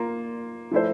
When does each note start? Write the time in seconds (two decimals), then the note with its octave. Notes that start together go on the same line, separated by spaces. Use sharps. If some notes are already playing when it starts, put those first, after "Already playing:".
Already playing: A#3 F4
0.72 F3 A3 E4 A4 C5